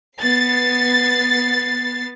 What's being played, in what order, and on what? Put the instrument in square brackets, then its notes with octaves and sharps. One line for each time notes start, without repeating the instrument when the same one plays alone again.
[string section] B3 A6 C7